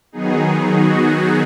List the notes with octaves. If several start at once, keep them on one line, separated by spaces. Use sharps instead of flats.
D#3 F#3 B3 D#4 G#4
F#4